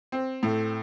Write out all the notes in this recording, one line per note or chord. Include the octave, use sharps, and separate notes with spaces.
C4
A2